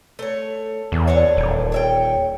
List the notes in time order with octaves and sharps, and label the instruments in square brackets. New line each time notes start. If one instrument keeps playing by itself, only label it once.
[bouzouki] A3 C#5
[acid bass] E2
[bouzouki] D4 A4 C#5
[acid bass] D#1
[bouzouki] C#5 E5 G5